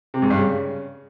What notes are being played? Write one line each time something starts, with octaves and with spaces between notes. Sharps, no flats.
C3
G#2
G2
C#3